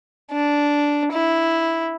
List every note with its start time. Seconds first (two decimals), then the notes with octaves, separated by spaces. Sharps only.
0.31 D4
1.12 E4